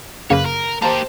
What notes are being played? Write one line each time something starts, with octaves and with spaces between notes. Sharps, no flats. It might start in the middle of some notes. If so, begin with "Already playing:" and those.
F#2 C#3 A#3 B4 C#5
A#4
A#3 G4 C5 A5 A#5